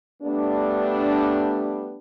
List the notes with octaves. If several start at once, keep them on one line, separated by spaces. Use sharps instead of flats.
G3 A3 B3 D4